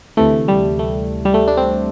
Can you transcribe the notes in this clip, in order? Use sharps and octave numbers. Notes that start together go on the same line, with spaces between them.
D2 C3 E3 A3
G3
A3
G3
A3
D4
C4